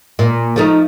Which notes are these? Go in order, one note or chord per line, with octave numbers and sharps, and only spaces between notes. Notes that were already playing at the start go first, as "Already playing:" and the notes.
A#2
F3 A3 D#4